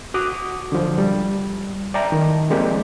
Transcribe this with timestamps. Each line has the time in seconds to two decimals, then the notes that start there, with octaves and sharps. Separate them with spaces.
0.14 F#4 F#5 D6 D#6
0.72 D3 F3
0.98 G3
1.94 D5 E5 G5 A5 A#5
2.12 D#3
2.50 F3 G#3 A#3 C4 G4 D5